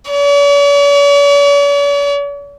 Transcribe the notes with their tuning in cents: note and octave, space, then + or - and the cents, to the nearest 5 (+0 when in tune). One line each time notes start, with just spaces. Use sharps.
C#5 +45